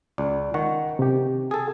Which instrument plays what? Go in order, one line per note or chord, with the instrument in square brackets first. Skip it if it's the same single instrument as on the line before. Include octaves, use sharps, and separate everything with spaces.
[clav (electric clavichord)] C#2 [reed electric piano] D5
[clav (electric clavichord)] D#3 [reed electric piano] F#5 C#6
[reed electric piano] C3 G4
[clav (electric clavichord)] G#4 A4